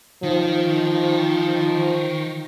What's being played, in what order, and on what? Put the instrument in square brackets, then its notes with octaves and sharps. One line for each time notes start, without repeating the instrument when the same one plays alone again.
[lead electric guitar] D#3 [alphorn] F3